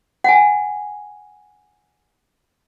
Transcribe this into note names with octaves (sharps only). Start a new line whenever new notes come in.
F#5 G#5